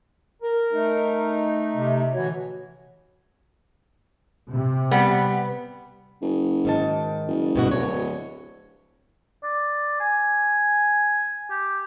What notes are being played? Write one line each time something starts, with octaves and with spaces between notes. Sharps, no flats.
A#4
A3 D#4
C3
B2 D3 E3 F#4 C#5
C3
G3 B3
F#1
G#2 D#3 A5
F#1
G2 B2 F#4
D1 C#5
D5
G#5
G4